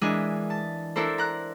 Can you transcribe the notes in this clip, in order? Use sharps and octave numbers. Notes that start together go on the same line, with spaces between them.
E3 G#3 D4 A#4 D#5 G#5
A5
D4 E4 A4 A#4 C5
A#5 F#6